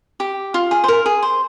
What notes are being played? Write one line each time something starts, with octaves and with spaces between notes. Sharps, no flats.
G4
F4
G#4
C5
A#4
G#4
C5